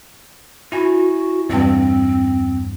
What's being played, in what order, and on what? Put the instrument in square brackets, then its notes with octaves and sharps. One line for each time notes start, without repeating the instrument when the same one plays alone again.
[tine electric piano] E4 G#5 [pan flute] F#4
[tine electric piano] E2 G2 [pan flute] C4